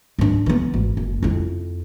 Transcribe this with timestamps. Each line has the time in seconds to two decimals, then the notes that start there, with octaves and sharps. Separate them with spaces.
0.18 G#2 D4
0.46 E3 B3
0.74 G#1
0.97 F#1
1.23 F2 E4